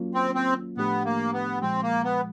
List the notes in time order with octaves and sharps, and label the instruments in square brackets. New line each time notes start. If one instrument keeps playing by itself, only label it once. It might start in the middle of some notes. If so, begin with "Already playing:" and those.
Already playing: [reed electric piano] F#3 A#3 C#4 F4
[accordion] C4
C4
[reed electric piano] A2 F3 A3 D4 G4 [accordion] B3
[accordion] A#3
B3
[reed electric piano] A#2 F3 G#3 [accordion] C4
[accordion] A#3
B3